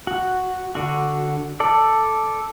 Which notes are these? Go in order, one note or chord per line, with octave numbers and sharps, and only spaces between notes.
F#4
D3 F#4
A4 D5